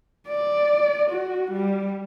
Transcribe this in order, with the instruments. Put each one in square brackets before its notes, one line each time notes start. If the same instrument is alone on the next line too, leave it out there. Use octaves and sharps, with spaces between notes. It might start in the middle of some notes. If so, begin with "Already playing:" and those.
[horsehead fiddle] D5
F#4
G3